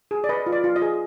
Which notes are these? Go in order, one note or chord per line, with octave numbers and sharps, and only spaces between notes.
G#4
D5
B4 D#5
F4
D5
F4
D#5
G#4